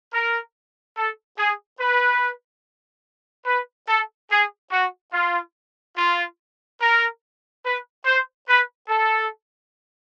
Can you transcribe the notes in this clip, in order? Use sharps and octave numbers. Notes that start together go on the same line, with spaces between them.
A#4
A4
G#4
B4
B4
A4
G#4
F#4
F4
F4
A#4
B4
C5
B4
A4